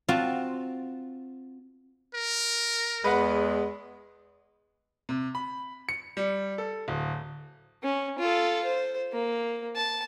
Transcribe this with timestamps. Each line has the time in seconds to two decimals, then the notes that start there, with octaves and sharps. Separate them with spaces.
0.08 C4 F4 F#4 A5 C6
2.14 A#4
3.04 E2 G#3 B4 F#5
5.09 C3
5.35 B5
5.89 C#7
6.17 G3
6.58 A4
6.88 D1
7.84 C#4
8.19 F4 A4
8.64 C5
9.12 A#3
9.75 A5